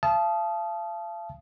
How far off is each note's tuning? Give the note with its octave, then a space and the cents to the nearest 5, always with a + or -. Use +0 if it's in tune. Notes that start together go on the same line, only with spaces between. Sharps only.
F5 -40 A5 -25 D#6 +0